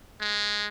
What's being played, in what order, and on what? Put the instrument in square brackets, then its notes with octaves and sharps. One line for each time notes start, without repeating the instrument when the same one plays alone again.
[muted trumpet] G#3